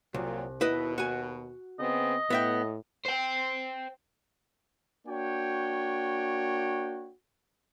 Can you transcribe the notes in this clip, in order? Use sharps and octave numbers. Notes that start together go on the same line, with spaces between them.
C2 A#2 F#3
D#2 B2 E4 B4 D#5
F#4 G#5
C#3 B3 C4 D#5
A2 B3 E5 G5
C5 G5
A#3 D4 F#4 C#5 G5